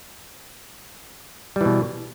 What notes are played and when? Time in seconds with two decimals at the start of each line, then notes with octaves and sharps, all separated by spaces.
1.56 G3
1.61 E3
1.65 B2